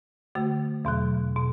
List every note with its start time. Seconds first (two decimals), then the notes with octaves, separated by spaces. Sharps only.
0.35 D3 A3 F#4
0.85 E2 B2 F#3
1.37 B2